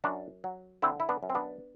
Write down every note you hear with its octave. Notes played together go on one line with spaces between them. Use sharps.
F#2 D4 F#4
F#3
D3 C4 E4
E4
B3 D4
F#2
C4
B3 D4